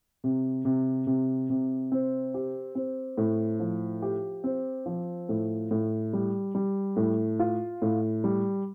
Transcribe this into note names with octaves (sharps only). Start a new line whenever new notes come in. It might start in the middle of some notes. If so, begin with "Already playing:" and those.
C3
C3
C3
C3
C4
G4
C4
A2
F3
G4
C4
F3
A2
A2
G3
G3
A2
F4
A2
G3